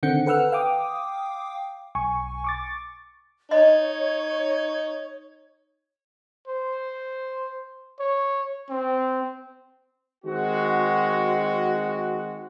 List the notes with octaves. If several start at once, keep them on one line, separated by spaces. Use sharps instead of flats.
D3 D#3 C4 F#5 G6 C#7
A4 B4 F#5 E6 F6
F5 G5 D6 D#6
B1 G#5 C#6
C#6 D6 A6
D#4 C#5 D#5
C5
C#5
C4
D#3 G#3 C4 F#4